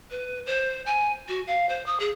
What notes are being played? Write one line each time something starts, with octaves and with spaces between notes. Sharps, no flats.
B4
C5
G#5
F#4
F5
C5
D#6
G#4